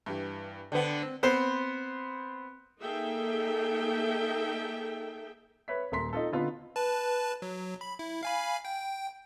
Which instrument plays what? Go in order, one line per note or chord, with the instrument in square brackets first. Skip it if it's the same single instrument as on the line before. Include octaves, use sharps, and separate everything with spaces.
[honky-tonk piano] G2 E3 G4
[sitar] D3 B3 [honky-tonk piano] C5 G5
[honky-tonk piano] C4
[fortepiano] B3 C4 C5
[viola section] A#3 D#4 G#4 A4 E5 G5
[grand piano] B4 C#5 E5 B6
D#1 A#3 A#5 C6 B6
D#4 F4 A4
D3 B3 D#4 F4 A4
[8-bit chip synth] B4 A5
F#3
B5
E4
F5 G#5 B5
G5